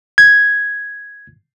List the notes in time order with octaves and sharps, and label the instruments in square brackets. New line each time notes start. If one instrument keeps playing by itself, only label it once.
[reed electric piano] G#6